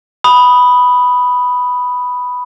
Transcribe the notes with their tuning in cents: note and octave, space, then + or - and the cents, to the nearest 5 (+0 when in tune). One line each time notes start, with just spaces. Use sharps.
B5 +0 D#6 +0